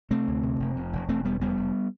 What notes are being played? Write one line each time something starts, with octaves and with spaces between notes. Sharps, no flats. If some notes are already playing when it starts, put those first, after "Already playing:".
C3 A3 C4
D2
C3
F1
F2
F1
E1 A3 C4
E1 G3 B3
E1 G3 B3
F1